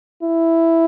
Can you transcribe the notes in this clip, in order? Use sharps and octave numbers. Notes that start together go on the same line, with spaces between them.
E4